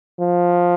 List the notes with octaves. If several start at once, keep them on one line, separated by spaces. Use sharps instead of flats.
F3